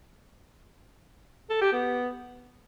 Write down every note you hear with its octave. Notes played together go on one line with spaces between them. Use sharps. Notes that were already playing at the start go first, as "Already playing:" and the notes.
A4
G4
B3